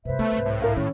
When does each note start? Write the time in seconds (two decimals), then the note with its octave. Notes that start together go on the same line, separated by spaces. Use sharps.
0.05 G2 C3 B4 C5 E5
0.19 A3 B3
0.32 C2 G#2
0.46 A2
0.62 E4 A#4 F5
0.76 D#3 C#4